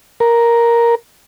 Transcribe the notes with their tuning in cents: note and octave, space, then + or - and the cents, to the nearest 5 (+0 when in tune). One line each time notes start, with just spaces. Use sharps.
A#4 +5